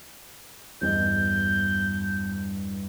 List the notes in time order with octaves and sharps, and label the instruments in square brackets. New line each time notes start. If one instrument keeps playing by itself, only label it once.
[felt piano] E2 G2 D#5 [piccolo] G6